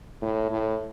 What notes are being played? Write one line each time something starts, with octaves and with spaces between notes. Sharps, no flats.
A2
A2